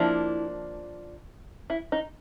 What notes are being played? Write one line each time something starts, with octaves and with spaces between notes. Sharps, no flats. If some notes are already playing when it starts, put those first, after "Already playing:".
Already playing: F3 A#3 D4 E4
E4
D#4